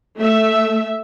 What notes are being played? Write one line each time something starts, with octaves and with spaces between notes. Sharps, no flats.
A3 E5